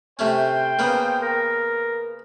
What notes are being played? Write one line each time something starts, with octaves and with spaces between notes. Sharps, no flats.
C3 A3 C#4 C5 G5
C#3 A#3 B3
A#4